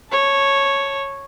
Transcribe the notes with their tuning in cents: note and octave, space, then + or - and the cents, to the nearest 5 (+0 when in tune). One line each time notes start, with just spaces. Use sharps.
C#5 -5 A5 +0